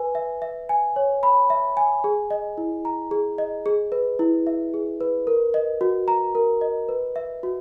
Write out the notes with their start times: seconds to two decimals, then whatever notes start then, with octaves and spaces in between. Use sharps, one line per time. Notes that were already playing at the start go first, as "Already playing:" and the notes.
Already playing: B4 G#5
0.15 E5
0.42 E5
0.69 G#5
0.96 C#5
1.23 B5
1.50 E5
1.77 G#5
2.04 G#4
2.31 D#5
2.58 E4
2.85 A#5
3.11 G#4
3.38 D#5
3.66 G#4
3.92 B4
4.19 E4
4.47 E5
4.74 G#4
5.01 B4
5.27 A#4
5.54 D#5
5.81 F#4
6.08 A#5
6.35 A#4
6.61 D#5
6.89 B4
7.16 E5
7.43 F#4